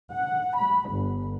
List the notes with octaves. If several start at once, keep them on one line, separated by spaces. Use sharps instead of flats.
F#5
B5
G1